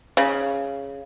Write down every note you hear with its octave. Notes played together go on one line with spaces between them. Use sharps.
C#3